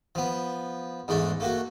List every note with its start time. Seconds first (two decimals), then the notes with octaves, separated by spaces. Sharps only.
0.15 F3 B3
1.08 E2 G#2 A3 D4
1.40 A3 A#3 F#4